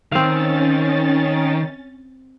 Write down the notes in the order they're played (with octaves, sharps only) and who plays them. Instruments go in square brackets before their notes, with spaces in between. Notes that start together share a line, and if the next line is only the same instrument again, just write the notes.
[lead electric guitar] D#3 [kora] C4 F5 [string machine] C#4 A6